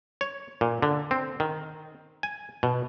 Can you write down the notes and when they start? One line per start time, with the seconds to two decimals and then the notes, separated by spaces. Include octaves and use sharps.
0.21 C#5
0.61 A#2
0.82 D3
1.11 C4
1.40 D#3
2.23 G#5
2.63 B2